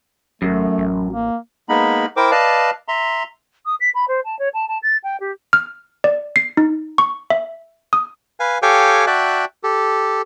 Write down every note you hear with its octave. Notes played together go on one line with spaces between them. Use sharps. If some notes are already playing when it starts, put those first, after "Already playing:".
G#1 F#2 A3
A1
A#3
G#3 A#3 B3 D#4 B5
E4 A#4 C5 G5 D6
B4 D5 D#5 F5 A5
E5 A#5 C6
D#6
B6
B5
C5
A5
C#5
A5
A5
A6
G5
G4
F6
D5
C7
D#4
C#6
E5
D#6
B4 F5 G#5
G4 A4 C#5 F5 G5 G#5
F#4 D5 E5 G5 A5 F#6
G4 A4